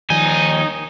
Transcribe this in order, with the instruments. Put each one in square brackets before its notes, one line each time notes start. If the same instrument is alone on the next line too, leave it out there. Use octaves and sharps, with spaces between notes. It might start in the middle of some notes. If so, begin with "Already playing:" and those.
[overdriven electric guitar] D#2 G#5 [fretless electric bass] D#3 F3 G3 [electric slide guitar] D#4